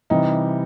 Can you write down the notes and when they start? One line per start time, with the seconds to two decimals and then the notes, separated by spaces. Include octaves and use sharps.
0.10 C3 E3 G3 D#4